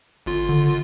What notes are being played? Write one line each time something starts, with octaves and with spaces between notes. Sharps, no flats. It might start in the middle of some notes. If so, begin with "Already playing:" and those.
G1 F4
D3